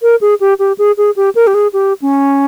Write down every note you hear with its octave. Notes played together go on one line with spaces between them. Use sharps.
A#4
G#4
G4
G4
G#4
G#4
G4
A#4
G4
G#4
G4
C#4